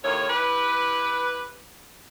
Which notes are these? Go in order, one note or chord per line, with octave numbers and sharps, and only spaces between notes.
D#2 A2 A#4 C#5
E4 G4 B4